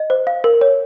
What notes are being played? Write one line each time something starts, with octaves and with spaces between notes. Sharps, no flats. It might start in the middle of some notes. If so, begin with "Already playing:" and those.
Already playing: D#5
C5
F5
A#4
C#5